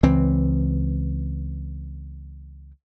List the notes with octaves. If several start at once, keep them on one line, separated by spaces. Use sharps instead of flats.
C#2 E3 C4